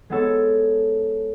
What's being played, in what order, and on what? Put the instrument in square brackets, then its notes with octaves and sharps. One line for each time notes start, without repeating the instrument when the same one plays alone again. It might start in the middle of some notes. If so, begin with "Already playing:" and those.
[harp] G#3 B3 A4 C#5